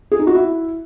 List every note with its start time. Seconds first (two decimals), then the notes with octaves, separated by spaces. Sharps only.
0.12 G#4
0.19 D#4
0.27 F#4
0.35 E4